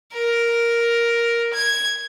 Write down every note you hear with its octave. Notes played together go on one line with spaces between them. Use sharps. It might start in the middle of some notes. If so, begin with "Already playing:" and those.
A#4
G#6